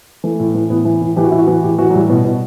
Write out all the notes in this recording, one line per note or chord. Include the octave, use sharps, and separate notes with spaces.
E3 A3
A2
E3
A2 B3
E3
A2
E3 G4
F#4
A2 E4
F#4
E3
A2 G4
E3 F#4
F#3
A2 G3
B2
B2